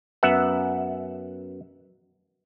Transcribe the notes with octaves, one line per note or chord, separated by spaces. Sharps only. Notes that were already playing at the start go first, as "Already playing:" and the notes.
F#2 B3 E5 F#5